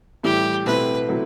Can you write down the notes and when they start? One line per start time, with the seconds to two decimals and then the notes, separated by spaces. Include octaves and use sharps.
0.23 A2 E3 G3 G4
0.66 B2 A3 C4 E4 B4
1.09 C3 F#3 A3 E4